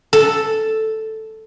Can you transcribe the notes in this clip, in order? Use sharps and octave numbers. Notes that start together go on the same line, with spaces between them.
A4